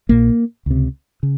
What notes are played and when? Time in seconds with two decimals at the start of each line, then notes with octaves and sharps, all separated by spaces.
0.09 A#1 A#2 A#3
0.66 C#2 C3
1.23 C#3